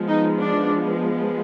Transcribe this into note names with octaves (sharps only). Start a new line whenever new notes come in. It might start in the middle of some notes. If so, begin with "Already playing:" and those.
Already playing: F3 G#3 B3
D#4
D4